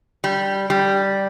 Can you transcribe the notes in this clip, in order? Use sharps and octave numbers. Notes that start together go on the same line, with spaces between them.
G3
G3